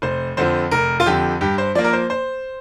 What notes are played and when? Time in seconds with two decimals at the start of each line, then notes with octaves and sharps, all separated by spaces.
0.02 F1 C5
0.37 F2 D3 F3 C5
0.71 F1 A#4
1.00 F4
1.06 F2 D3 F3 G4
1.41 G2 G4
1.58 C5
1.75 F3 A#3 D5
1.84 A#4
1.93 C5
2.10 C5